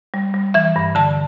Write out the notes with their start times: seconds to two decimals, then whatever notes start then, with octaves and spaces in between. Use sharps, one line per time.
0.14 G3
0.34 G3
0.54 E3 E5
0.76 G2
0.95 D3 A5